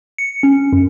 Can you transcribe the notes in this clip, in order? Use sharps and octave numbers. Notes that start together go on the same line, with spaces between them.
C#7
C#4
F#2